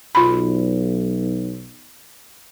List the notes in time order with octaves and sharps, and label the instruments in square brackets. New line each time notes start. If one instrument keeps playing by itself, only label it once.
[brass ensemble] B1 [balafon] F4 B5